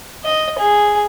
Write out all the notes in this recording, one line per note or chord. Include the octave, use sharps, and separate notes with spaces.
D#5
G#4